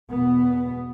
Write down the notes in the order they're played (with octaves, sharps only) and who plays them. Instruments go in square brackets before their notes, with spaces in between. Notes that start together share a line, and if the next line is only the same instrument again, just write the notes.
[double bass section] E2 B2 B3